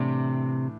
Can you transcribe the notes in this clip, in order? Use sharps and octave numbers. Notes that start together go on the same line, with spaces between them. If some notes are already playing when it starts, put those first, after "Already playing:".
Already playing: A2 C3 E3 A3 D4